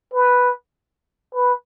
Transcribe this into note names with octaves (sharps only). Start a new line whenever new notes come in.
B4
B4